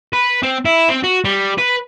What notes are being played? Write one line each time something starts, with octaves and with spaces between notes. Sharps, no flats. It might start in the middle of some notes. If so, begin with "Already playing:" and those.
B4
C4
E4
C4
F#4
G3
B4